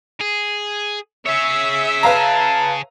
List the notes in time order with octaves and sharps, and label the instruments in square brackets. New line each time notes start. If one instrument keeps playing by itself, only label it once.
[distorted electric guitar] G#4
[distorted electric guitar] G#4 C#5 [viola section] E5
[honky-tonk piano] B4 F5 A#5 [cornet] A5